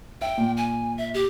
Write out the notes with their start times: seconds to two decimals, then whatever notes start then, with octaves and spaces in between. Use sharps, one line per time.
0.22 E5 G5
0.38 A#2
0.57 G#5
0.98 E5
1.14 G4